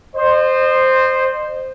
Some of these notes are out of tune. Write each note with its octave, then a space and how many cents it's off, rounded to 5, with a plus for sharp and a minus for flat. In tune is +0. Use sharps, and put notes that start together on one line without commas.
C5 +0 D#5 -35